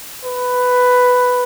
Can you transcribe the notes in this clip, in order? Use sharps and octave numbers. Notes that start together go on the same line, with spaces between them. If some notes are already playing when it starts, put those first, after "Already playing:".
B4